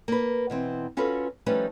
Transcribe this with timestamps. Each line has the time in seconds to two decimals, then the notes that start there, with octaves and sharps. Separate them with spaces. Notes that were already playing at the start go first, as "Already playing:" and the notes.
0.08 A#3 B4
0.50 B2 E3 C4
0.97 C#4 F4 F#4 A4 B4
1.46 F3 G3 A3 C#4 D#4 B4